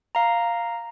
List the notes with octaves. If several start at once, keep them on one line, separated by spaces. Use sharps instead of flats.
F5 A#5